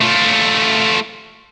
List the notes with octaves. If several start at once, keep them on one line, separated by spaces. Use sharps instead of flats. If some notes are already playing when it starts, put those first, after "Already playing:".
A3 F4